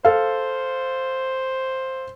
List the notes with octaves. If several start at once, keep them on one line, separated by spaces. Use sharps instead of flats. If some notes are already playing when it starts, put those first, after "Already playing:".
A4 C5 F5